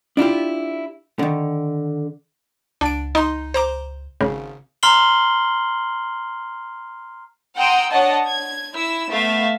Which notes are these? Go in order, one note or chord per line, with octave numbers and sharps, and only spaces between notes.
D4 E4 F4 G4
D3 D#3
C#2 D4 D7
D#4 C6
C5 A#5 D6
G#1 C#3
A#5 C6 F6 C7 F#7 G7
F#5 G5 A#5 C6 D#6 E6
D4 C#5 D#5 F#5 A5
G#6
E4 E6
A3 B3 E5 F5